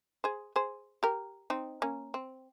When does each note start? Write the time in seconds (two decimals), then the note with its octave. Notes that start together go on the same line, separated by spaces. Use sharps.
0.24 G#4 C5
0.56 G#4 C5
1.03 G4 A#4
1.50 C4 D#4
1.82 A#3 C#4
2.14 C4